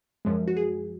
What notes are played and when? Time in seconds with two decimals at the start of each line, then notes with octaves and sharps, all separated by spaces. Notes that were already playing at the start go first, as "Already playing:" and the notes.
0.25 F#2 F3 G#3
0.48 F#4
0.57 G#4